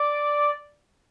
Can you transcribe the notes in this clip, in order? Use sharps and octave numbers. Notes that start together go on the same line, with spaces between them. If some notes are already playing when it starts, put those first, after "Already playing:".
Already playing: D5